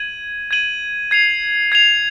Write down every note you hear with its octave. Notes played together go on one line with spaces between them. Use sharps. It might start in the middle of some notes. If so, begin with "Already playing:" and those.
Already playing: G#6 D#7 F#7
G#6 D#7 F#7
G#6 C7 F7
G#6 C7 F7